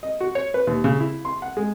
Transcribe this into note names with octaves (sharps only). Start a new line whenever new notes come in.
D#5
F#4
C#5
B4
D#2
C#3
E4
C6
F#5
G#3